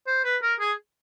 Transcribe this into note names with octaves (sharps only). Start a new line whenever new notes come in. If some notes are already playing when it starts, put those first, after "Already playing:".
C5
B4
A#4
G#4